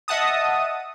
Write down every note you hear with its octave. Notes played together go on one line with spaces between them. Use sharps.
D#5 E5 F#5 A5 D#6